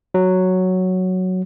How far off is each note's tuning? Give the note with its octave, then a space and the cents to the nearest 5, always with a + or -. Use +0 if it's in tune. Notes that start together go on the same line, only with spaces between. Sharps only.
F#3 +0